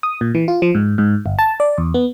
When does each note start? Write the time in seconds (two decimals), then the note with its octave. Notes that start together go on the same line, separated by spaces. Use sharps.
0.03 D#6
0.21 A#2
0.35 E3
0.48 F4
0.62 F3
0.75 G#2
0.98 G#2
1.26 G1
1.39 A5
1.60 D5
1.78 E2
1.94 B3